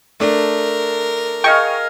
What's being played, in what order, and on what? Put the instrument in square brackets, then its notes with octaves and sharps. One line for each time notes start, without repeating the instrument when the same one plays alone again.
[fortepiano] A3 D4 [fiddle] A#4
[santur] G#4 D#5 F5 [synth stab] G5 C#6